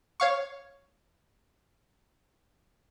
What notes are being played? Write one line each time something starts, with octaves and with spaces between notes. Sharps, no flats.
C#5 F5 C#6